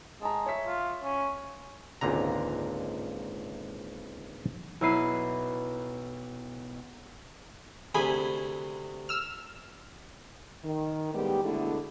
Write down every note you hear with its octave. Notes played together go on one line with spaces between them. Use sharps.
G#3 A5 A#5
C#5 E5 B6
F4
C#4
G#1 C#2 A#2 D3 A#5
B1 E4 B4 C7 D#7
D2 C3 G#4 G#5 B5
E6 F6
D#3
A2 G3 G#3 B3 D#4 G4
B2 D3 G#3 A3 D4 E4